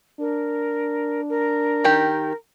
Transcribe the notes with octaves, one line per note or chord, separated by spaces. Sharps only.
D4 A#4
A#4
D#3 G4